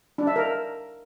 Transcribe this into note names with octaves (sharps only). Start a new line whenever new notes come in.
D4
E5
A#4